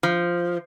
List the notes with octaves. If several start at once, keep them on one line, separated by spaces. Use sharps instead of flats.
F3